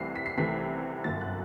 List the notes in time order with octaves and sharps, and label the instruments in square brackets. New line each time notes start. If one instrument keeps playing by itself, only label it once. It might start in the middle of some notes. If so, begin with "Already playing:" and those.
Already playing: [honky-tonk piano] C2 C3 E3 A3 C7
B6
C7
C2 C3 E3 A3 B6
G1 F#2 F#3 A6
F#6